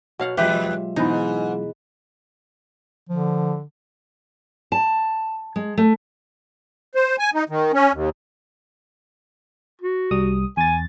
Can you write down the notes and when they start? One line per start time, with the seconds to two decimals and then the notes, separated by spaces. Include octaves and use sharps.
0.19 B2 F#4 C#5 F5 F#5
0.37 E2 F#3 G#3 F4 G4 B4 E5
0.96 G#2 B2 E3 D#4 G#5 B5
3.09 D3 F3
4.72 A5
5.56 G#3
5.78 A3
6.95 C5
7.19 G#5
7.34 D#4
7.49 D#3
7.73 C#4
7.93 D#2
9.82 F#4
10.11 C2 G3 D#6
10.57 E2 G#5 A6